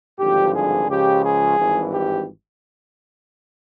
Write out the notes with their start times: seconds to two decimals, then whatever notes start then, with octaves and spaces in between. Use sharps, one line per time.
0.18 G#1 G2 D3 F3 G4
0.54 G#4
0.88 C#2 C#3 F3 G4
1.23 G#4
1.57 G#1 G2 E3
1.92 G4